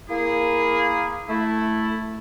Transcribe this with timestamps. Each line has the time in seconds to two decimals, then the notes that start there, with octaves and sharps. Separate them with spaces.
0.10 A#3 E4 G#4
1.29 A3 E4